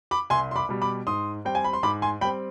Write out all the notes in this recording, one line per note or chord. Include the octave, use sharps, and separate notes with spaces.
B5 D6
C2 G#5 C6
C6
B5 D6
B2 G3
B5 D6
G#2 C6 D#6
G3 C4 G5
G#5
B5
C6
G#2 B5 D6
G#5 C6
G3 C4 G5 B5